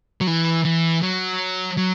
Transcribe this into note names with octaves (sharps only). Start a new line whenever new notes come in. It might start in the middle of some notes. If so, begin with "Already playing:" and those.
F#3
E3
E3
F#3
F#3